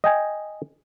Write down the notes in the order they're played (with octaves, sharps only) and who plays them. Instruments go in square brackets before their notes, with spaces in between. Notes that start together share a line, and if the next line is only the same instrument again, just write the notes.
[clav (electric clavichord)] D#5 G5 G#5